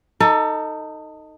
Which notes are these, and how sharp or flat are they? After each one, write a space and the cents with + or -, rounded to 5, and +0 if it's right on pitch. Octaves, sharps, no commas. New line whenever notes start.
D#4 +0 A4 +25